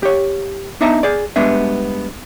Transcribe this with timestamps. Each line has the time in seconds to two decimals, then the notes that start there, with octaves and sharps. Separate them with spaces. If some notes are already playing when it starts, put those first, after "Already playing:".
0.03 G4 C#5
0.81 B3 D4 D#4 E5 A5 A#5
1.03 G#4 D5
1.36 G2 G#3 B3 D4 E5